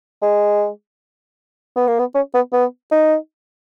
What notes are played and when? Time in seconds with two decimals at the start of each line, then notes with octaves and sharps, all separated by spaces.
0.22 G#3
1.76 B3
1.87 A#3
1.99 B3
2.15 C#4
2.34 B3
2.53 B3
2.92 D#4